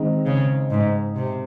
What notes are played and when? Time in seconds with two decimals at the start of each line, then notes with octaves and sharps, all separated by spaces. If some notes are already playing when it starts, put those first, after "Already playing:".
Already playing: D#3 G#3 C4 D#4
0.25 C#3
0.70 G#2
1.16 C3